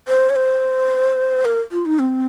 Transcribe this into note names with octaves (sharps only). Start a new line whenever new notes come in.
C5
C#5
C5
A#4
F4
D#4
C4